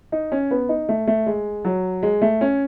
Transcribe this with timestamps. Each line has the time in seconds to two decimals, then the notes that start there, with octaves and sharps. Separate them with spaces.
0.12 D#4
0.32 C#4
0.51 B3
0.69 D#4
0.89 A3
1.07 A3
1.26 G#3
1.65 F#3
2.03 G#3
2.22 A3
2.41 C#4